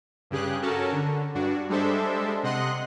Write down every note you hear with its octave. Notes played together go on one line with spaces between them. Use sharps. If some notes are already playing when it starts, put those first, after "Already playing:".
G2 C#3 G4 G#4 F#6
C#4 F#4 A4 A#4 A5
D3
G2 D4 F#4
G3 G#3 D4 A4 C5 E5
C3 D#5 F#5 C6 F#6